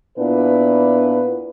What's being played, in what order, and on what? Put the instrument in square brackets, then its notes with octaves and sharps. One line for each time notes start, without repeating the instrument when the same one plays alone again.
[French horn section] A#2 B3 D4 E4 B4